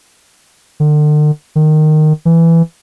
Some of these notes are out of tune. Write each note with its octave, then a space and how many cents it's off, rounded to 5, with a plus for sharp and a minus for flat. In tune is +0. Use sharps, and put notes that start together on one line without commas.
D3 +40
D#3 -15
E3 +10